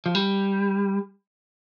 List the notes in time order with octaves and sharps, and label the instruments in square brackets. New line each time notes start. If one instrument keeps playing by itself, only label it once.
[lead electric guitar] F3
G3